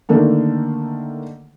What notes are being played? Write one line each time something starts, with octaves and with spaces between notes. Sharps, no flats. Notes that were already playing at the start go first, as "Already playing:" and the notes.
D3 D#3 A3 A#3 D4